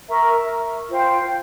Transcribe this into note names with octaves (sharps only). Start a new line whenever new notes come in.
A#4 E5 A#5 C#6
F4 C5 G5